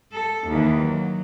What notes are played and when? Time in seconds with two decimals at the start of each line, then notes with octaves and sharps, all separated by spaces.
0.12 A4
0.48 D#2 E3
0.83 F#3